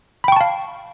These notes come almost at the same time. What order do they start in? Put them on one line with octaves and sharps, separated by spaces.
B5 G5 C#6 A5 F5